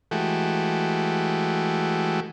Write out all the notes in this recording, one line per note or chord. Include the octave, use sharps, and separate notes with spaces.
E3 G#3 A3 F#4 G4